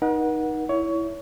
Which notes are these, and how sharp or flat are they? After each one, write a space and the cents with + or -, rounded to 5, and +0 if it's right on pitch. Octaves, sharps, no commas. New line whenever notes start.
D#4 +0 A#4 +45 F#5 -10
E4 +0 C#5 +25